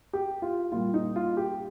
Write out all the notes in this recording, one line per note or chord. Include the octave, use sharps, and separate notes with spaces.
G4
F4
A#2 G3 F4
D#4
F4
G4